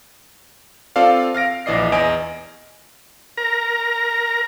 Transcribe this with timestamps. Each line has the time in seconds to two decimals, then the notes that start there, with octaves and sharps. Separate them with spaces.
0.96 C4 F4 A4 D5 F5
1.35 F5 F6 A#6 D7
1.66 A#1 E3 D5 D#5 C7
1.92 E2 D#5 G#5 D7
3.38 A#4 A#5